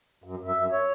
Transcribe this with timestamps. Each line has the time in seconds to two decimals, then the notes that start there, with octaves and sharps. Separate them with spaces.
0.24 F#2
0.39 F#2
0.48 E5
0.56 F#2
0.72 C#5